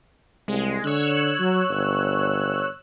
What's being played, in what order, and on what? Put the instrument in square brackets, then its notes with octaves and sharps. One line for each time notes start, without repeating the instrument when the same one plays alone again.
[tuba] C2 [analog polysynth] G#3
[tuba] D3 [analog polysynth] C#5 E6 F#6
[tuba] F#3
G1